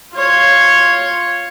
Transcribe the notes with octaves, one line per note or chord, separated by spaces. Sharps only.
F4 C#5